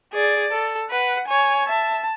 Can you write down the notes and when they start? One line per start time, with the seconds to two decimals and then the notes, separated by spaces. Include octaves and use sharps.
0.12 G#4 D5
0.51 A4
0.89 B4 F#5
1.28 C#5 G#5
1.66 E5 A5